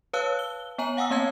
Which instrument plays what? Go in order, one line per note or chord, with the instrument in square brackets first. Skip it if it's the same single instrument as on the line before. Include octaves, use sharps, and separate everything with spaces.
[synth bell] B4 C#5 F5 A5 E6 F#6
G7
B3 C#5 G#5 A#5 F#7
F5 F#5 G#5 D#6 E6
A#3 C4 C#5 F5 A5 G#6